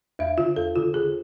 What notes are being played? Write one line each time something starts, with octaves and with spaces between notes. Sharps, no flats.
E2 E5
D3 F4
E2 A4
D3 F4
D3 G#4